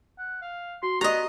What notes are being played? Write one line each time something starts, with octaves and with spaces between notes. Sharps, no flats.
F#5
F5
F#4 C6
B3 G4 D5 D#5 A#5